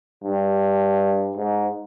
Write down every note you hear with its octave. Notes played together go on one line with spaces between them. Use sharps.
G2
G#2